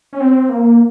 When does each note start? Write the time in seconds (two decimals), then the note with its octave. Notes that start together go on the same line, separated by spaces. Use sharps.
0.13 C#4
0.20 C4
0.49 A#3